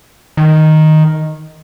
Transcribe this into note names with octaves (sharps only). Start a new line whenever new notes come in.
D#3